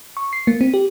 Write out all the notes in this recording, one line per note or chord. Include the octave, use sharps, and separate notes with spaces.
C#6
C7
A#3
C4
G4